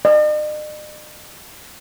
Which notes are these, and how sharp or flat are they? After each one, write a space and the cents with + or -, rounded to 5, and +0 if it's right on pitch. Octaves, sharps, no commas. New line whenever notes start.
D#5 -45